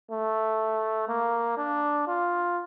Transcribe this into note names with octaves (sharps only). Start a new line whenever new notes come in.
A3
A#3
D4
F4